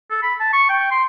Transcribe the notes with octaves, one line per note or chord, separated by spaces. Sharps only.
A4
B5
A5
C#6
G5
C6